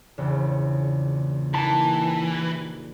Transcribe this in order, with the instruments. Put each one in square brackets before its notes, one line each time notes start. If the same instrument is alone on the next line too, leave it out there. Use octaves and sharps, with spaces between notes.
[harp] A#1 E2 C#3
[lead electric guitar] E3 [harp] A#3 D#4 G4 [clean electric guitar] A5